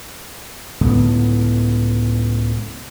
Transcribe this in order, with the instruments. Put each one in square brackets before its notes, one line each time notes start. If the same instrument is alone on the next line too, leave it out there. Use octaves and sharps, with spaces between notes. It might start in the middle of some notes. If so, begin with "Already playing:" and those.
[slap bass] C#2 A2 D3 B3